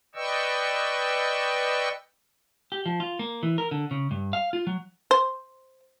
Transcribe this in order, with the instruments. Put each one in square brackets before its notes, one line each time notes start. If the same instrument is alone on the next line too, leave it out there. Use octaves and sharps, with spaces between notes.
[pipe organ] B4 D5 D#5 G5 C#6 E6
[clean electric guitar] G4
F3
F4
A#3
E3
A#4
D3
C#3
G2
F5
F4
F#3
[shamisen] C5